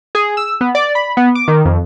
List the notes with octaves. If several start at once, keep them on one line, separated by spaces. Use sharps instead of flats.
G#4
E6
B3
D5
B5
B3
D6
D#3
F2